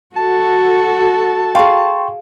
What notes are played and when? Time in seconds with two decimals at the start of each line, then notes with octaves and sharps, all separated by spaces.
0.16 F#4 A4 A5
1.55 G#4 F5 G5 C6 C#6